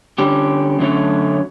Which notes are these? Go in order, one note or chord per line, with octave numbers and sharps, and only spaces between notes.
D3 G3 C#4 G4
F#2 D3 F#3 A3 C#4